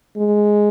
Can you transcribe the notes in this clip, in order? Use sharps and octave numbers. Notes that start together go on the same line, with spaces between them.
G#3